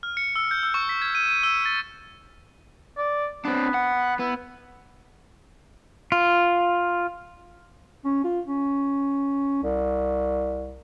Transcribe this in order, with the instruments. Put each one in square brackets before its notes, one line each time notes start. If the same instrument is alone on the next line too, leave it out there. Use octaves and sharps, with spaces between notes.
[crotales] F6
C#7
E6
G6
E6
C#6
B6
G#6
D#7
D#7
E6
A6
[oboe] D5
[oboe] B3 [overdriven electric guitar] C4 D4
[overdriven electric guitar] F#5
[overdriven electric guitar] B3 [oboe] E4
[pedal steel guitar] F4
[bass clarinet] C#4
F4
C#4
C2